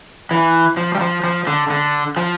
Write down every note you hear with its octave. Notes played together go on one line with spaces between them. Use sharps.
E3
F3
G3
F3
F3
D3
D3
F3